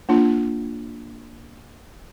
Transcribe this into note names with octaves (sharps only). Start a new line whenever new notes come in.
A#3 D4 F4